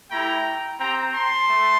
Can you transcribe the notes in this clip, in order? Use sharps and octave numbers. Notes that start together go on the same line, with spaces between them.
A3 E4 G4 G5 A#5
C4 G4 G5 A#5
A5 C6
A3